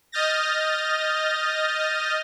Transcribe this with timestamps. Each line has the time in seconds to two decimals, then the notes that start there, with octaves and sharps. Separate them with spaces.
0.12 D#5 D#6 F6 G6 A6 A#6